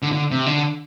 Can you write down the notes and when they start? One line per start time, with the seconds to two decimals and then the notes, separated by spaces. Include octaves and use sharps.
0.02 D3
0.12 D3
0.31 C3
0.46 D3